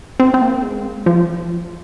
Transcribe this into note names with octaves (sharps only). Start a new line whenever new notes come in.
C4
C4
A#3
G#3
F3